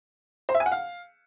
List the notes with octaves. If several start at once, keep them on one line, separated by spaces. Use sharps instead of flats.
C5
E5
G#5
F#5
F5